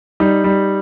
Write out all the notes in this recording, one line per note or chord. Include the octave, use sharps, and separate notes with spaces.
G3 D#4
G3